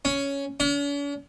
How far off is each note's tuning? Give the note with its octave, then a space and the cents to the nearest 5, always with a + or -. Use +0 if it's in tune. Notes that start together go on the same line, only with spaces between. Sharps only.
C#4 +5
C#4 +45